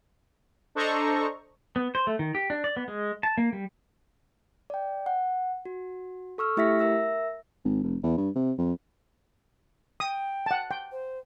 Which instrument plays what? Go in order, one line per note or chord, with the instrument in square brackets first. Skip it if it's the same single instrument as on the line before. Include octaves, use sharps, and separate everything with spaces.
[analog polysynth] D4 A4 C5 D#5 A#5 C#6
[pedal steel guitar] B3
C5
A3
D#3
G4
D4
D5
B3
G#3
A5
A#3
G3
[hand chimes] D5 G5
F#5
F#4
A4 C#6 E6 F6
A3 E4 G4 E5 A#6 B6
A#4 E5 E6 A#6
[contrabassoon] G#1
F1
E2
G2
C3
F2
[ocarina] G5 [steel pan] D#6
[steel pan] F#5 A5
G5
[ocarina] C5